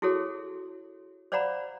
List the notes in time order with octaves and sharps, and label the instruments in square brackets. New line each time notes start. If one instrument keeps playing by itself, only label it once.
[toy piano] E4 F#4 G#4 A4 C#5
C5 D5 F5 F#5 A#5 B5